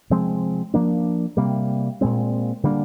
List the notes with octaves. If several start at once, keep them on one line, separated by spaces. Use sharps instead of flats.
C3 F3 G#3 C4
F3 A#3 D4
C3 G3 A#3
A#2 G#3 C4
D3 G3 A#3 D4